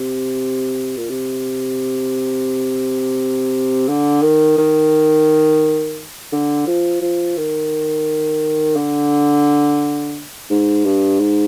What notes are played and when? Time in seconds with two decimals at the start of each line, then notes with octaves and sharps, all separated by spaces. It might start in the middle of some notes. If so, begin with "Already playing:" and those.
Already playing: C3
0.97 A#2
1.09 C3
3.88 D3
4.22 D#3
4.58 D#3
6.32 D3
6.67 F3
7.01 F3
7.37 D#3
8.76 D3
10.50 G#2
10.85 G2
11.20 G#2